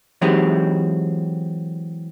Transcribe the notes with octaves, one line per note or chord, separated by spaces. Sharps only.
E3 F#3 G#3 C4 D#4 G4